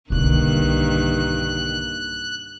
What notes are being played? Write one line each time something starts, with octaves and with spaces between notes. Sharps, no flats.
B1 G2 D3 D#3 A#3 F#6